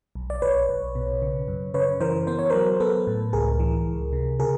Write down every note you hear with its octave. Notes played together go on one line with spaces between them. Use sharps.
B1
D5
B1 B4 C#5
B1
B2
C#3
F#2
C#3 B4 C#5
E3 A#4 C5
B3 C5
C#5
F#3 A#4 C5
B3 A4 B4
A2
C#2 G#4 A#4
E3
C#2
C3
C#3 G#4 A#4